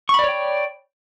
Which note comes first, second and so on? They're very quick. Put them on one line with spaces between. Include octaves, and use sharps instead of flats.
C#6 B5 D5 C#5 G5